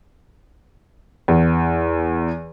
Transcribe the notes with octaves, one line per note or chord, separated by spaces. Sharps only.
E2